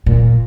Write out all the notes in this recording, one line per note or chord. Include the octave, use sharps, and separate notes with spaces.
A#2